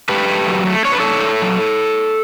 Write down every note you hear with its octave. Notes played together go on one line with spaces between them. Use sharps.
A3 G4 B4
A3
F#3
A3
D4 C#5
B4
D4 A4 C#5
A3
F#3